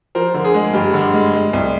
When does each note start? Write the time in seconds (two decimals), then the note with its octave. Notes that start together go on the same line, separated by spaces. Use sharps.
0.15 F3 A#4 C5
0.34 D3
0.44 G#4
0.54 G#3
0.74 G2 G4
0.94 D3
1.14 G#3
1.34 G#3
1.53 C2